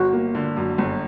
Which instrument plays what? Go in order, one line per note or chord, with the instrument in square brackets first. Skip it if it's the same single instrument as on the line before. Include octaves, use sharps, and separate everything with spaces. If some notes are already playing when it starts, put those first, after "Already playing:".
Already playing: [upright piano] G1 [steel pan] F#4
[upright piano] A#3
D3
F#2
G1